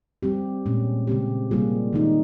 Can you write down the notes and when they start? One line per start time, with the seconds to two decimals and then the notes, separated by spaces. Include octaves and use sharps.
0.23 G3 C4 G4
0.66 A#2 G#3 C#4
1.07 C#3 G#3 C4 G4
1.51 C3 G3 A#3 F4 G#4
1.93 D#3 G#3 D#4